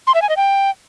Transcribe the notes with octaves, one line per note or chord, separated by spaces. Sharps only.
C6
E5
G#5
D#5
G5